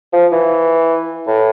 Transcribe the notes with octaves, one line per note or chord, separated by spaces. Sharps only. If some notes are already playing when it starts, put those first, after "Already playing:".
F3
E3
A2